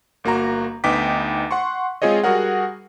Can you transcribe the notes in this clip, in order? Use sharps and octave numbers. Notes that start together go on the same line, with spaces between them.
G1 A#3 F#4 A#5
D2 B3 D#4 G5 D6 B6
F#5 C6 C#6
G#3 C4 F4 G#4 C#5 D#5
G3 F#4 G#4 A#4 F#5